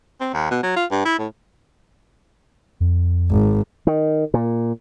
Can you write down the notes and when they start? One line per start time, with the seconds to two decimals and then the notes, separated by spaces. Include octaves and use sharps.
0.21 C4
0.33 D#2
0.51 B2
0.63 F#3
0.76 F4
0.91 G2
1.05 E4
1.18 A2
2.80 F2
3.31 G#1
3.87 D#3
4.34 A#2